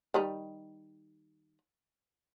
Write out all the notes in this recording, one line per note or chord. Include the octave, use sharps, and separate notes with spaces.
D#3 G3 D#4